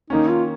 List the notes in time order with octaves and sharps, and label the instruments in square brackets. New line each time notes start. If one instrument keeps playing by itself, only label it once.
[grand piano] D#3 A#3 C#4 [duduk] D#4
[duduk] F4